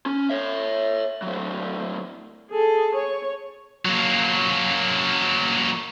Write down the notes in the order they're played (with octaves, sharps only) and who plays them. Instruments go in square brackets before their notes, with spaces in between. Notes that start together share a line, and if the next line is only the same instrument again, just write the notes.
[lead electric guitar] C#4
C#5 E5
A2 F#3
[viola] G#4 A4
C#5
[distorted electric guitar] F#3 A#3